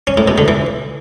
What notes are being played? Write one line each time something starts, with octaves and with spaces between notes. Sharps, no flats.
C#4
A2
B2
D3
E3